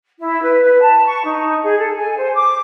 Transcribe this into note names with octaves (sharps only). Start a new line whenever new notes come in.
E4
B4
B4
A5
C#6
D#4
G#4
A4
G#5
C5
D6